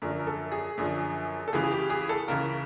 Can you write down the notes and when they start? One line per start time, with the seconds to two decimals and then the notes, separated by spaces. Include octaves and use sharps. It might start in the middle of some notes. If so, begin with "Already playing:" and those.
0.02 F#2 D3 F3 A#4
0.19 A#4
0.27 A4
0.52 G#4
0.77 F#2 D3 F3
1.48 A4
1.52 C#2 C#3 E3 G#4
1.63 G#4
1.71 G4
1.90 G#4
2.09 A4
2.28 C#2 C#3 E3 A#4